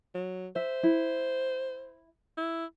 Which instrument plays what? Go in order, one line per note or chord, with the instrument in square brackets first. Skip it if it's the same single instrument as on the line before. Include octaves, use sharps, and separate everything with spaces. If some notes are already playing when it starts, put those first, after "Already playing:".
[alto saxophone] F#3
[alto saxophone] C5 [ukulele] E5
[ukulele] E4
[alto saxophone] E4